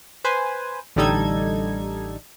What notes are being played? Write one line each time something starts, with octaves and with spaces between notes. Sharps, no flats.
B4 C5 G#5
A1 D3 G3 D#4 A4 G#6